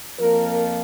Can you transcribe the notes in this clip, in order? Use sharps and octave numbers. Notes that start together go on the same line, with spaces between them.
F2 F3 A#3 A#4